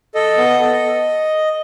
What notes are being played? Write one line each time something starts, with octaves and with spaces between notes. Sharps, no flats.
A4 D#5
B3
A4